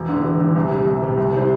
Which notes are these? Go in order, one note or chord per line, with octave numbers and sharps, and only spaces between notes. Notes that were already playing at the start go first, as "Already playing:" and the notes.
Already playing: E1
E2 D3
E1
E2 D3
C2
C3 G3
C2
C3 G3
C2
C3 G3 E4 C5